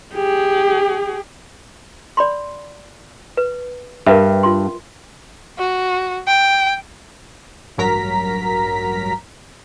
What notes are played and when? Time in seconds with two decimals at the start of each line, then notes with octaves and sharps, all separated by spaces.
0.14 G4 G#4
2.17 D5 B5 C6
3.37 B4
4.07 G2 A#4 B4 E5
4.43 F4 C6
5.59 F#4
6.27 G5
7.78 A1 G2 F#3 A#4 A#5 B6